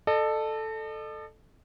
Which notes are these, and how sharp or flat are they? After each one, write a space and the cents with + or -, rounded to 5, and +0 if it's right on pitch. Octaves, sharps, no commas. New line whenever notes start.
A4 +0 D#5 -45